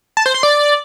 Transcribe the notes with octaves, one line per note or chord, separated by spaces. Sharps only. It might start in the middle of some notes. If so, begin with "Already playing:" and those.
A5
C5
C6
D5